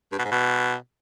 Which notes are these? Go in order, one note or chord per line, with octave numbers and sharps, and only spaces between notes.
G2
B2
G#2
B2